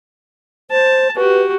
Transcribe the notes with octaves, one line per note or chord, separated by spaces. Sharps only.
C5 A5
F#4 G4 B4